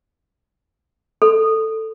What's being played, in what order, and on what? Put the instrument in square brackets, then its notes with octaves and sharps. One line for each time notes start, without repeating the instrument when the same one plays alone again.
[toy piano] A4